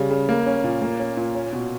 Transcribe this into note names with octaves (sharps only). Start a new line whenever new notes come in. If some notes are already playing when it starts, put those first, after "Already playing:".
Already playing: C#3 G3
C#3
A#3
C#4
A#2
A#3
C#4
A#2
C#4
B2